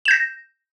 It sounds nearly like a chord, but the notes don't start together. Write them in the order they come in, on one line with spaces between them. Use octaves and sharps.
E7 G6 A#6